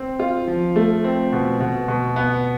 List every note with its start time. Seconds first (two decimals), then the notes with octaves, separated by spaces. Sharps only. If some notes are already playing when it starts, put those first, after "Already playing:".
Already playing: C4
0.20 F4
0.48 F3
0.76 A3
1.04 C4
1.33 B2
1.60 B2
1.88 B2
2.16 B3